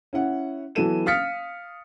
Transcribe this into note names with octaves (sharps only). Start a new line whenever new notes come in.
C#4 E4 F#5
E3 F#3 B3 A4 D#7 E7
F5 D#6 F6 A6 B6 C#7